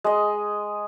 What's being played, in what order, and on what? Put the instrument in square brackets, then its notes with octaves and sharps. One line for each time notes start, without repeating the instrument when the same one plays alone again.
[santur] G#3 D#5